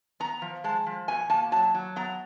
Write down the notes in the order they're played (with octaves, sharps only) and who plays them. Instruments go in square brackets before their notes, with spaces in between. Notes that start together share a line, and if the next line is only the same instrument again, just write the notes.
[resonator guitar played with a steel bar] B3 A#5
F3
G#3 A5
F3
B2 G#5
A#3 A5
F#3 A5
F#3
B3 A#5